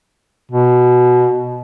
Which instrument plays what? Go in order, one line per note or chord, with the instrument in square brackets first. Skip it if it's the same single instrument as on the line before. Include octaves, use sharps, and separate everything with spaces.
[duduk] B2